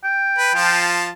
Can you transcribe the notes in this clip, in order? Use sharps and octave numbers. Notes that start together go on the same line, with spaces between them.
G5
B4
F3 F4 A5